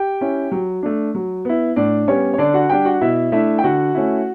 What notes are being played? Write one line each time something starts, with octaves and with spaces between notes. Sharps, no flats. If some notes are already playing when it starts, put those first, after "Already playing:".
Already playing: G4 G5
C#4 E4
F#3
A3 D4
F#3
B3 E4
A2 D4 D5
G3 B3 C#4 C#5
C#5
D3 D4 D5
F#4 F#5
G3 D4 G4 G5
F#4 F#5
B2 E4 E5
A3 D4 E4 E5
G5
D3 F#4 F#5
A3 C#4 E4